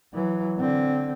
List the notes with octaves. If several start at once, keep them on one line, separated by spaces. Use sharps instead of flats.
E3 F#3
D3 C4